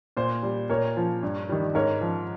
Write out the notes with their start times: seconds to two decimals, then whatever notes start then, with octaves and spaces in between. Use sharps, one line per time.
0.17 A#2 C5
0.43 G3
0.70 A#2 A#4 C#5
0.96 F3
1.23 G2
1.49 D#3 G3
1.75 G#2 A#4 C#5
2.01 F3